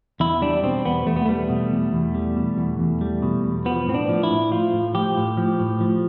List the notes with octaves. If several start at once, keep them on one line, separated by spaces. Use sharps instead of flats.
E2 E4
G3 D4
B2 C4
E2 B3
E2 A3
B3
G3 A3
B2
E2
E2
G3
B2
E2
E2
G3
B2
E2
F3 B3
A2 C4
D4
F3
E4
A2
F3 F4
A2
F3 G4
A2
F3
A2
F3